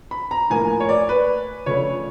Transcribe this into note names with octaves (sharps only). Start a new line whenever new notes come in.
B5
A#5
A2 F3 A#3 G#5
C#5
D5
B4
C#3 F3 A3 D4 C#5